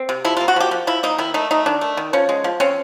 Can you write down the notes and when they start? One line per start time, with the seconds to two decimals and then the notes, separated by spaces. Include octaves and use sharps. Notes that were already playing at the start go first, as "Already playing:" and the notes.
Already playing: C4
0.09 C3
0.25 F3 E4
0.37 F4
0.40 A#3
0.48 F#4
0.56 F3 G4
0.71 F3
0.87 F3 E4
1.03 A#3 D#4
1.18 D#3 E4
1.34 A3 D#4
1.51 A3 D#4
1.66 D#3 D4
1.81 A3
1.97 D#3
2.13 F3 C#4
2.29 G#3
2.44 F3
2.60 C4 C#4